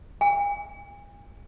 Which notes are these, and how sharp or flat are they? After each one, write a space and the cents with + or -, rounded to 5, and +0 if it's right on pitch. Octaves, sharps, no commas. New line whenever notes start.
G#5 -40